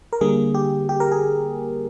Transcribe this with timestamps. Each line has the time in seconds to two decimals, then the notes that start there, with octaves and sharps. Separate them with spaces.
0.13 A#4
0.21 D3 G3 A#3 G#4
0.54 G4
0.89 G4
1.00 A#4
1.12 G#4